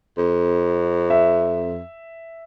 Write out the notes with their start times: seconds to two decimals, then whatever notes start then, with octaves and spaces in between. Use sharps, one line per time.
0.18 F2
1.10 E5